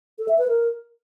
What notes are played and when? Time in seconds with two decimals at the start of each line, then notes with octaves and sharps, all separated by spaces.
0.19 A4
0.28 E5
0.38 B4
0.48 A#4